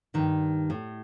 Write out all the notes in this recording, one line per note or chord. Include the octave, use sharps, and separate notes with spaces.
G2 D#3
A2